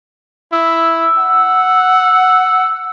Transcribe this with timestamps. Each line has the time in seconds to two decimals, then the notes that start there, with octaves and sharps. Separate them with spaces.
0.52 E4 E6
1.18 F#5